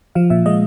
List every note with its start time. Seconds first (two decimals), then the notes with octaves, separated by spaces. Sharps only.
0.15 F3 F5
0.30 A#2 E5
0.46 G#3 D#5